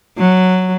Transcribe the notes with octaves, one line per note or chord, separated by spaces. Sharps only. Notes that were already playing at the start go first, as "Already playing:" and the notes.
F#3